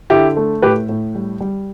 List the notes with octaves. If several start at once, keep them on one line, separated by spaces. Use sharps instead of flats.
D3 E4 G4
A3
A2 G4 B4
A2
G3
G3